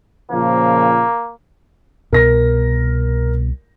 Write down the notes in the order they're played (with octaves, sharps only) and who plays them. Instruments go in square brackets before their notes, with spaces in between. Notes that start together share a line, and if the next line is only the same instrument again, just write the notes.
[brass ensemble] A#2 C#3 F3 [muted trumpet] A#3
[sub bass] C2 [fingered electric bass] B2 [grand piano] A#4 A#6